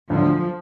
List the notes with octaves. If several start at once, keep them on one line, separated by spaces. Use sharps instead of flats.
D2 F3